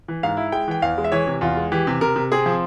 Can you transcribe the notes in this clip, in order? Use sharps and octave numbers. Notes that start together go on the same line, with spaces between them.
E3
G#2 F5
E4
G#3 G5
E3 G5
E2 F5
G#3
E5
E3 C#5
C3
E2 F4
G#3
E3 G4
C3
C3 A#4
C3
C4 G#4
F3